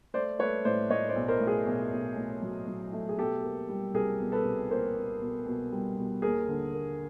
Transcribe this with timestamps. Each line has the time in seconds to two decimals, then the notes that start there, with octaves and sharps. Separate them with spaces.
0.14 A3 C5 D5
0.39 A3 B4 C#5
0.65 A2 C5 D5
0.90 A2 C#5 D#5
1.09 C5 D5
1.15 B1
1.28 A#4 C5
1.41 A2
1.47 G#4 A#4
1.67 B1
1.92 B1
2.17 A2
2.42 F#3
2.67 F#3
2.93 A3
3.09 G#4
3.18 B2 G4 A4
3.44 A#3
3.69 G3
3.94 C2 G#4 A#4
4.20 B2
4.32 A4 B4
4.45 C2
4.70 A#3 A#4 C5
4.96 A#3
5.21 B2
5.46 B2
5.72 G3
5.98 B2
6.22 D#2 G#4 A#4
6.48 D3
6.74 A#3